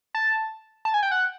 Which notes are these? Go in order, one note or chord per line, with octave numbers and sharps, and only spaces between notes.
A5
A5
G#5
G5
F#5